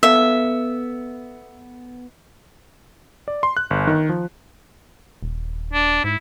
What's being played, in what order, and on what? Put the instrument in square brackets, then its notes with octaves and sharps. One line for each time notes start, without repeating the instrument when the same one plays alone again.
[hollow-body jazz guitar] B3 A4 F5 [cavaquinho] E5
[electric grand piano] D5
C6
F#6
G1
D#3
F3
[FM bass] D#1
[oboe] D4
[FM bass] G#2 [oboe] E4